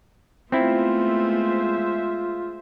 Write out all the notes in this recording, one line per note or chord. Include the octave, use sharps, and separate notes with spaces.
G#3 A3 B3 C4 E4 F4 C5 E5